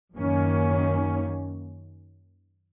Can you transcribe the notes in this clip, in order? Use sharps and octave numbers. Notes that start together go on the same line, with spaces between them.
F#2 D#3 A#3 C#4